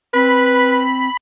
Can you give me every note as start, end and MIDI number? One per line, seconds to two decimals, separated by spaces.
0.14 1.08 60
0.14 0.83 71
0.14 1.17 83